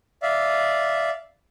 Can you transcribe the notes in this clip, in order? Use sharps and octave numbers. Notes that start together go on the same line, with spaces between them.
D5 E5 F5